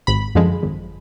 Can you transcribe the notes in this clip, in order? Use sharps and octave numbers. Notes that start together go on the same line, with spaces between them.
G#1 B5
F#2 D3 F3 G#3
G#1